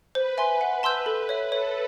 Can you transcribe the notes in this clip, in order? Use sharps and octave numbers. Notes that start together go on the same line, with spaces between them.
B4 C5
E5 G#5 C6
F#5
A5 C6 E6 G6
A4
C#5 E5
A4 C#5